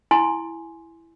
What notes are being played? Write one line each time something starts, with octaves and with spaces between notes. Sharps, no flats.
E4 G#5 C6